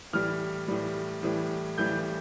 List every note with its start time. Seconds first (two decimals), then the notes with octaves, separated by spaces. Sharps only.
0.13 A2 E3 G3 F6
0.68 A2 E3 G3
1.23 A2 E3 G3
1.78 A2 E3 G3 G6